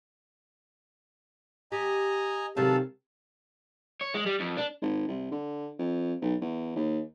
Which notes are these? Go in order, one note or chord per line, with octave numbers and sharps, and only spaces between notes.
G4 D#5 G#5 A#5
C3 D#3 F#3 G#3 G4 A4 F5 A5
C#5
G#3
G3
F2
D4
G#1
C2
D3
F2
B1
E2
D#2